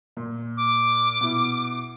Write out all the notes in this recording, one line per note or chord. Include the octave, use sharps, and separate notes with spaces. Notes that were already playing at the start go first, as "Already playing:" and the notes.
A#2
D6
B2 E4